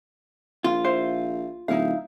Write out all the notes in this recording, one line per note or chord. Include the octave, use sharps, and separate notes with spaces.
A#1 F4
E4 C5 F5
D1 D#4 E4 F5